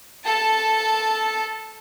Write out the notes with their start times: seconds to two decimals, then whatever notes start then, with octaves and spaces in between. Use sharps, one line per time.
0.24 A4 A5